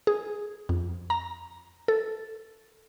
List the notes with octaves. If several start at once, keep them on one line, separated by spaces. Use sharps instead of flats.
G#4
F2
A#5
A4